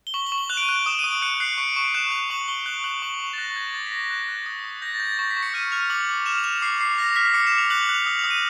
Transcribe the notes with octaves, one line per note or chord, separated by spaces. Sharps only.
G7
C#6 F#7
G7
C#6
F#7
F#6 F7
D7
D#7
F#6
D#6 E7
D#6 D#7
D7
F#6 C#7
F#6 C7
C#6 D7
C#6 D7
F#6 E7
E7
F#6 F7
C#6 F#7
C#6 G7
F#6 F#7
F#6 F#7
C#6 F#7
F7
C#6
E7
A6
F#6 A#6
F#6 G#6
D6 A6
B6
D6 A#6
F#6
F#6
D#6
D#6
G6 A#6
A6
G6
A6
C#6 A#6
B6
C#6
C#7
F6 D#7
F6 F7
D6 F#7
D6
F6 E7
F7
F6 E7
D6 C7
D6 C7
F6 A#6
F6 B6
D6 C#7
E7
D6
F7
F#6 F#7
F7
F#6
F7
D#6
F7
D#6
D#7